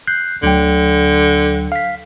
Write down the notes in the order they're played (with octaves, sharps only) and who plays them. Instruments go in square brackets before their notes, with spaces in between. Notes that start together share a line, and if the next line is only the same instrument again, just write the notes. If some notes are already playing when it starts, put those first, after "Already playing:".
[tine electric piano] F#6 G6 C7
[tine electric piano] D2 F#3 G5 [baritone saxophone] D3
[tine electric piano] F5 B6